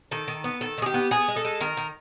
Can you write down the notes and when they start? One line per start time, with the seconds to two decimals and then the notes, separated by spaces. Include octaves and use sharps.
0.11 D#3 A4
0.28 D#3
0.44 B3
0.61 D#3 A4
0.78 D#3 G#4
0.86 G4
0.94 B3
1.11 B3 G#4
1.28 G#3
1.36 A4
1.45 G#3
1.61 D#3 A#4
1.77 D#3